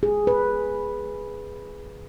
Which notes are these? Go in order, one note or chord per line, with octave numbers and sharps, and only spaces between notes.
G#4
B4